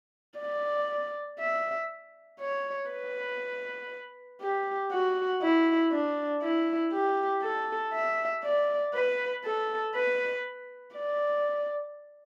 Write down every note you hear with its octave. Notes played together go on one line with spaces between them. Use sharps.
D5
E5
C#5
B4
G4
F#4
E4
D4
E4
G4
A4
E5
D5
B4
A4
B4
D5